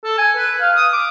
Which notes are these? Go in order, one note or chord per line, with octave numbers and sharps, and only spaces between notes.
A4
G#5
B4
F5
D#6
D6